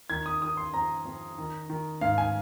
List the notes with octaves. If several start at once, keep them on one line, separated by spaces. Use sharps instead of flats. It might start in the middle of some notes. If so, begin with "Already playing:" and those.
D#3 G#6
D#6
D#3 D#6
C6
F2 A#5
F2
D#3
D#3
G#2 F5
G#5